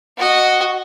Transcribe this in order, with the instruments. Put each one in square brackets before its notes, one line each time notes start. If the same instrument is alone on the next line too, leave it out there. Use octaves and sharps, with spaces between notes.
[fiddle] F#4 D#5